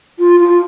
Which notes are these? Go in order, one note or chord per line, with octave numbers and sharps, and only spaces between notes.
F4
F4